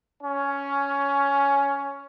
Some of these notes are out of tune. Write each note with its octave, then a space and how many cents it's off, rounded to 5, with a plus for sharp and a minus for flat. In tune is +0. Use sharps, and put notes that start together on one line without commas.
C#4 +10